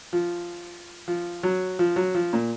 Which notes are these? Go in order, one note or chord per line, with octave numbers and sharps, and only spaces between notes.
F3
F3
F#3
F3
F#3
F3
A#2